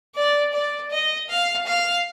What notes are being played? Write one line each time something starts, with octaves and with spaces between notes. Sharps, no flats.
D5
D5
D#5
F5
F5